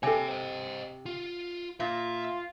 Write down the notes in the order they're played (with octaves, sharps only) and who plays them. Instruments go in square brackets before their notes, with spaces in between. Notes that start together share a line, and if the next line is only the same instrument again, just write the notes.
[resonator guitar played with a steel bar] C3 [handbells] A4 G#5 [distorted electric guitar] C#5 G5
[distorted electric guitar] C5 D#5
F4
[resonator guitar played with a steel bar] A#2 [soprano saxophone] F4 [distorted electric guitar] E5